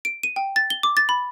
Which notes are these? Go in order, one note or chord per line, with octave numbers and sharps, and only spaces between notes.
D7
D#7
G5
A6
G7
D6
A6
B5